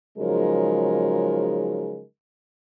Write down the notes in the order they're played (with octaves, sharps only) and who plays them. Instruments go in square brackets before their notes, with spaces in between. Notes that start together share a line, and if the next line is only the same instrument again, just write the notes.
[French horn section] C#3 F3 F#3 G#3 D#4 A#4